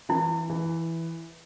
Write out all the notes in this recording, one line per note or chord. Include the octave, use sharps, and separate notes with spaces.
E3 E4
E3